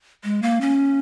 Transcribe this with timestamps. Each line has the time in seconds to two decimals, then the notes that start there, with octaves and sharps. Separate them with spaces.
0.24 G#3
0.42 A#3
0.61 C#4